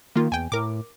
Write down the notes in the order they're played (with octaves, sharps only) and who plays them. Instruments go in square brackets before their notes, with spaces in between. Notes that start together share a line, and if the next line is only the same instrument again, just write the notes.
[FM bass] D#3 [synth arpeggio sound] A#3 F4
[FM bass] E2 [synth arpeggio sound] G5 G#5
[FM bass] A2 [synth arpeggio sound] A#4 D6